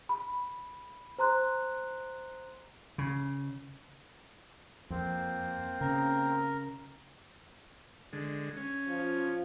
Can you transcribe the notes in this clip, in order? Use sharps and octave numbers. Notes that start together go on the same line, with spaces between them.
B5
C5 A#5 C6 F#6
C#3
F2 A#3 C4
C#3 A#4
D3 G#3
C#4
F3